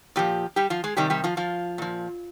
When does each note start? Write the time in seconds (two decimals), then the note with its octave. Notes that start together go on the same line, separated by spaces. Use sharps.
0.16 A#2 F3 G3 G4
0.56 G3 G4
0.70 F3 F4
0.84 G#3 G#4
0.97 C3 D#3 G3 G4
1.10 G3 G4
1.24 F3 F4
1.37 F3 F4
1.78 A#2 F3